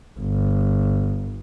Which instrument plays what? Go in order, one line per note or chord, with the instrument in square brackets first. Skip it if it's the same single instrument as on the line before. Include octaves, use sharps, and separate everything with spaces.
[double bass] G1